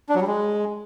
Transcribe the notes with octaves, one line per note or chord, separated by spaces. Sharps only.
D4
F#3
G3
G#3